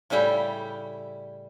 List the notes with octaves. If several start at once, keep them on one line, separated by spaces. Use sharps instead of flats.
A2 C#3 G3 E4 G5